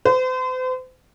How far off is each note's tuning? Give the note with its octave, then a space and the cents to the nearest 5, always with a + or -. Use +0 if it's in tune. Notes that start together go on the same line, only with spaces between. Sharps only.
C5 -40